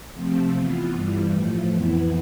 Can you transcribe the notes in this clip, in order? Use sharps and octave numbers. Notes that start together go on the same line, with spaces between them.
C3 F3 A3 C4
E3 B3 F4
G2 E3 G3
A2 F3 A3
F2 E3 B3 E4